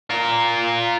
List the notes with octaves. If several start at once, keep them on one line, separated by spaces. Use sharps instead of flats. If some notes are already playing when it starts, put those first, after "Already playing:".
F4 A#4